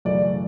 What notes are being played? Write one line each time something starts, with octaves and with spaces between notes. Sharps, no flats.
F#2 C#3 E3 A3 D5